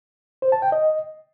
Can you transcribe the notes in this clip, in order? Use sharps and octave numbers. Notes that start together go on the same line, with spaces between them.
C5
A5
G5
D#5